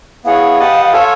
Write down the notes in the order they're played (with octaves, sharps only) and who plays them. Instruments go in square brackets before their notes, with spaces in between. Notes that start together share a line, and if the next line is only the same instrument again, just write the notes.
[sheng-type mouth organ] B3 E4 G#4 C#5 F#5 [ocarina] F5
[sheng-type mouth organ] G4 B4 D#5 F#5 A5
F4 A4 C#5 E5 G#5